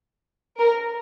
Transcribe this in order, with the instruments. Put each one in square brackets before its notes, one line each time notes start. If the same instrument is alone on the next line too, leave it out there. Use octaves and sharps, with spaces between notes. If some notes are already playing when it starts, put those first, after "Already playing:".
[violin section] A#4